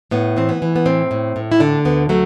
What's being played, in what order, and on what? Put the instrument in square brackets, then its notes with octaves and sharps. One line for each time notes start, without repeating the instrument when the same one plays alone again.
[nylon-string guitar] A2 B3
E3 C4
B3
E3
B3
A2 C4
A2
A2
E4
D3 D4
D2 B3
F#3 A3